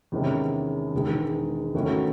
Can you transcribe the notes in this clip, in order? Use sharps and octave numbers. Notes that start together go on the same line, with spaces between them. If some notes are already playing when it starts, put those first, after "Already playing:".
E2 C3 D#3 G#3 C#4
E1 E2 D#3 G#3 D#4
E2 D#3 A3 C#4 F#4